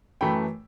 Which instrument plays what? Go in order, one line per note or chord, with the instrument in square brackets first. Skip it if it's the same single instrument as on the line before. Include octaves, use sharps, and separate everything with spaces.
[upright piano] F#2 E3 A3 G5 B5